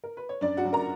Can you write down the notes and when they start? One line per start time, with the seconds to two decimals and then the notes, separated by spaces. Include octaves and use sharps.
0.04 A#4
0.17 B4
0.29 C#5
0.41 F#2 D4 D5
0.57 F#4 F#5
0.65 F#2
0.73 A#4 A#5